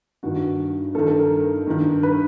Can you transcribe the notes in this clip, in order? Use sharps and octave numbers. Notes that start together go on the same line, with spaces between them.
G2 D#3 F#4
G2 D#3 A4
A4
A#4
G2 D#3
B4